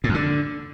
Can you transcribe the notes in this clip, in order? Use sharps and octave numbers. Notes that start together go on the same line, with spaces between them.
A2
F2
D3